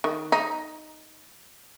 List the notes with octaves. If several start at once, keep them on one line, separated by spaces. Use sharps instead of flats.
D#3
D#4